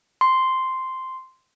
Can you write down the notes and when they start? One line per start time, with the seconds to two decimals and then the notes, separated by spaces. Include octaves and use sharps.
0.21 C6